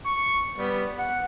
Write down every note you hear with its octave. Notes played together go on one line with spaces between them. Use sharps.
C#6
G3 B3
F#5